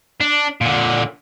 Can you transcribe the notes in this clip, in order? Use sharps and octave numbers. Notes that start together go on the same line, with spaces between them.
D4
A#2 D3